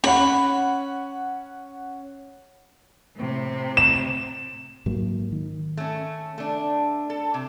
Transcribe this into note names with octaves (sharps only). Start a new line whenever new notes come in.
C#4 F#5 B5
A2 C3
E7
G#2 F#3 A#3
D#3
A3 C#4
A3 D4
A4
C3